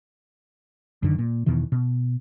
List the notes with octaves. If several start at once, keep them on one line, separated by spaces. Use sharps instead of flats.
F#2 D3 D#3
A#2
E2 B2 D#3 E3
B2